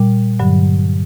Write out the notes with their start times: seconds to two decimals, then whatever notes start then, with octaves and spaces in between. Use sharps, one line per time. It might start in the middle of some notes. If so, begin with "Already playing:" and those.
Already playing: A#2 G3
0.40 G2 D3 F#3